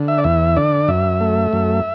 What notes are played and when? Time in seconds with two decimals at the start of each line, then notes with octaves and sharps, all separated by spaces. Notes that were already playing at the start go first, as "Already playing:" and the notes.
Already playing: D3
0.08 E5
0.18 D5
0.24 E2 E5
0.56 D3 D5
0.88 F#2 E5
1.21 A3
1.53 F#2